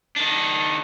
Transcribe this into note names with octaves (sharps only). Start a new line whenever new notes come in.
D#3 D4